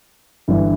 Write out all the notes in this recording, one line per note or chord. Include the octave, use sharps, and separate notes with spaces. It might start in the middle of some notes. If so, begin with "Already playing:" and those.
G1 G2 E3 E4